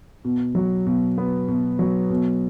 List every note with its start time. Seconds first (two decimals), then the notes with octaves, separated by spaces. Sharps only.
0.25 B2
0.55 F#3
0.87 B2
1.18 B3
1.48 B2
1.79 F#3
2.10 B2